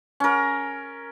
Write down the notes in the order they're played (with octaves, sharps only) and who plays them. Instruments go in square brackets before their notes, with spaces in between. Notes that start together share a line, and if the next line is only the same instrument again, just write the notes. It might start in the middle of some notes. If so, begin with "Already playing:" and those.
[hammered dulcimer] C#4 A#4